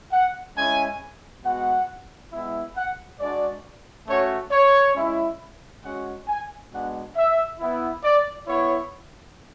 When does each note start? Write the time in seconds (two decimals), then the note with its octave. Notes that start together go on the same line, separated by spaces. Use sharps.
0.12 F#5
0.56 G#3 C#4 E4 G#5
1.44 G#3 B3 F#4 F#5
2.32 G#3 B3 E4
2.76 F#5
3.20 G#3 D4 F#4 D5
4.08 A3 C#4 F#4 C#5
4.52 C#5
4.96 G#3 C#4 E4
5.83 G#3 C#4 F#4 F#5
6.28 G#5
6.72 G#3 B3 D4 F#4 F#5
7.15 E5
7.60 B3 E4
8.04 D5
8.47 B3 E4 C#5